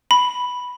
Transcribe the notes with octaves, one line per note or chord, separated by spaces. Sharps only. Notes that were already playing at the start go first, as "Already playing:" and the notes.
B5